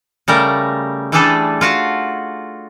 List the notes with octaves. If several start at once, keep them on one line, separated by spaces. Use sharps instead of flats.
C#3 G3 A3 A#4
E3 G3 A3 D4 G#4 A4
F4 F#4 F5 F#5